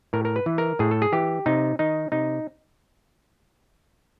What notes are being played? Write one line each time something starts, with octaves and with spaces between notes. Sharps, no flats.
A2 A#4
A#4
B4
E3
A#4
A2 G#4
A4
G#4
E3 G4
C3 D#4
D#3 D#4
C3 D#4